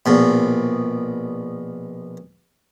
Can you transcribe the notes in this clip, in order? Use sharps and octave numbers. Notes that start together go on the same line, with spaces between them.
A#1 B2